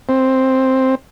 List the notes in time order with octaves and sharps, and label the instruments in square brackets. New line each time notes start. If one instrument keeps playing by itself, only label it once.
[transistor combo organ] C4